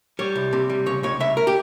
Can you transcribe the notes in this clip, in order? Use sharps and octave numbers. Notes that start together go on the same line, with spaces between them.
G3 C#5
C2
C3
G3
C#3 C#5
C#2 C#5
C#2 E5
A#4
G4